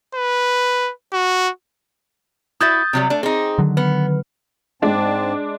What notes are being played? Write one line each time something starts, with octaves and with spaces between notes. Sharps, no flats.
B4
F#4
E4 F#4 E5 D#6 G6 A6
C3 F#3 G3
A3 D4
C4 D#4 G#4
D3 D#3 F#3
B3 B4
G#2 G#3 C4 D4 A5